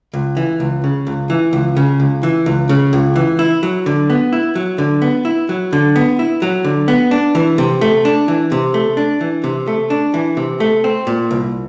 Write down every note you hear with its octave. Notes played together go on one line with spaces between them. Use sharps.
C#2
E3
C#2
C#3
C#2
E3
C#2
C#3
C#2
E3
C#2
C#3
C#2
E3
E4
F#3
D3
B3
E4
F#3
D3
B3
E4
F#3
D3
B3
E4
F#3
D3
B3
D4
E3
C3
A3
D4
E3
C3
A3
D4
E3
C3
A3
D4
E3
C3
A3
C4
A#2
C2